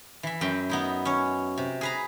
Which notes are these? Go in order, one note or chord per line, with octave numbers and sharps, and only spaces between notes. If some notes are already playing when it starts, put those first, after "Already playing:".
E3 E5
F#2 G5
B3 D#4 E4
C#4 C#5
C3
G#4 B4 A#5